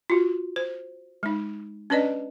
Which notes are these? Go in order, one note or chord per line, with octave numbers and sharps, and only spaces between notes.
F4 F#4
C5
G#3 D#4
C#4 D4 B4 D5 D#5